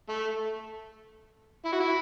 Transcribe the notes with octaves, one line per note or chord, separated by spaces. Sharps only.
A3
E4
F#4
E4